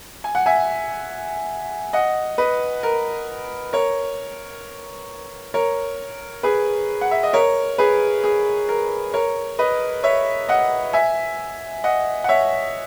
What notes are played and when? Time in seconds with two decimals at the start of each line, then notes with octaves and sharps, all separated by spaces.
0.24 G#5
0.35 F#5
0.46 E5 G#5
1.93 D#5 F#5
2.38 B4 D#5
2.83 A#4
3.73 A#4 C#5
5.54 A#4 C#5
6.43 G#4 B4
7.01 F#5
7.11 E5
7.23 D#5
7.33 A#4 C#5
7.78 G#4 B4
8.24 G#4
8.69 A#4
9.14 A#4 C#5
9.59 B4 D#5
10.04 C#5 E5
10.49 D#5 F#5
10.93 E5 G#5
11.84 D#5 F#5
12.24 F#5
12.29 C#5 E5